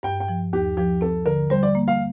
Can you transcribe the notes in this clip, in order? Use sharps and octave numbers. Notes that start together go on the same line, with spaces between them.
G2 G5
G5
F3
D#2 G4
F3 G4
C4 A4
D3 A#4
G3 C5
D5
A#3
F5